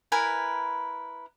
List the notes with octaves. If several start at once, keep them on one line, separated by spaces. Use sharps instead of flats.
E4 A#4 B4 G#5